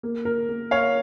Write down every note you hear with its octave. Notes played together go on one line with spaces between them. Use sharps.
A#3
A#4
A#3
C#5 F5